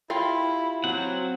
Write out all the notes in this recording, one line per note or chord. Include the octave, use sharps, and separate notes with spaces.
E4 F4 G4 F5
F#3 C4 F#5